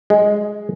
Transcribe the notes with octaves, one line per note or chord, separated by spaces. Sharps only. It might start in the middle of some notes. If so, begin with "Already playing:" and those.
G#3